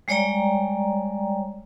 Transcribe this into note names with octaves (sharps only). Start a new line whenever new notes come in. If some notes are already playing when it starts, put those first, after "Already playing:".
G3 G#3 C#5 D5 G5 A#5